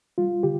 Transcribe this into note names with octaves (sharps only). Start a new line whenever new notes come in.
G3 F4
D3 G4